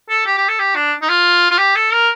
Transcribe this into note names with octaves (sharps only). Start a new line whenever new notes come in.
A4
G4
G4
A4
G4
D4
D#4
F4
F4
G4
A4
A#4